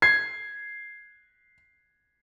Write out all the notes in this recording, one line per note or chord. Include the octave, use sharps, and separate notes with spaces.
G#6 C7